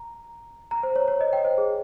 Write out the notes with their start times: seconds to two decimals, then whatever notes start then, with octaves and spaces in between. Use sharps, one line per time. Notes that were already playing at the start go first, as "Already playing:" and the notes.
Already playing: A#5
0.71 A#5
0.83 C5
0.96 C#5
1.08 C#5
1.21 D#5
1.33 G5
1.45 C5
1.58 G#4